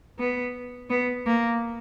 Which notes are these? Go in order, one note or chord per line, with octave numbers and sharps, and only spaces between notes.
B3
B3
A#3